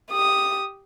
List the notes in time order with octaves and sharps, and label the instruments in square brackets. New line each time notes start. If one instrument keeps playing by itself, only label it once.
[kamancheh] G4 D#6